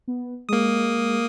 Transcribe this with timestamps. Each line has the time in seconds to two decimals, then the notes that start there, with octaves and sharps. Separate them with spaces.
0.08 B3
0.49 G#3 A#3 D#6